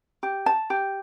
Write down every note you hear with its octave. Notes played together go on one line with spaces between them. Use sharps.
G4
A5
G4